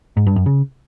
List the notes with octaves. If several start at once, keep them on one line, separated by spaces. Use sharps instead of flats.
G#2
G2
F#2
C#3